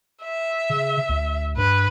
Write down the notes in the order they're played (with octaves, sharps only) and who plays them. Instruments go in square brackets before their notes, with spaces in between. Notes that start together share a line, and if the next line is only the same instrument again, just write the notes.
[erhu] E5
[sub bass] C#3
D2
[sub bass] G2 [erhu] B4